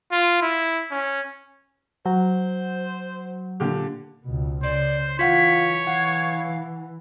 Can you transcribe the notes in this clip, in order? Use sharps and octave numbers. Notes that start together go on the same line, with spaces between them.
F4
E4
C#4
F#3 C5
A#2 D3 G4
C#2 B2
C#3 C5 D5
E3 F4 C#5 F5 F#5 B6
E3 F5 F#5